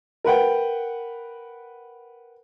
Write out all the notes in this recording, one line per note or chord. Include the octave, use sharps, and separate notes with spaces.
A#4 B4 F#5 G5